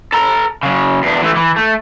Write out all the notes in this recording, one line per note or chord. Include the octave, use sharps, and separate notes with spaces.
A4 A#5
C#3 F#3
E2 D4
E3 A3
E3
A3